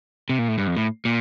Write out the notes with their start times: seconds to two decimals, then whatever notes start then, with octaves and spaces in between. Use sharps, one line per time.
0.29 C3
0.39 A#2
0.48 A2
0.58 G2
0.67 F2
0.77 A2
1.05 A#2